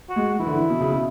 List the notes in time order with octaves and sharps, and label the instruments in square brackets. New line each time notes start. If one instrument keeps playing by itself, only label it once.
[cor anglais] F#4
[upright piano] G#3
[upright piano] E3 [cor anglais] E4
[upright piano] D3
E3
B2
C#3
B2